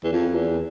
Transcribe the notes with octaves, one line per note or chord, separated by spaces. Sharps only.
E2
F2
E2